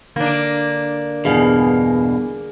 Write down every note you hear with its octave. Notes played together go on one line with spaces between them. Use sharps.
D3 A#3 D4
E2 G2 B2 G#4 F5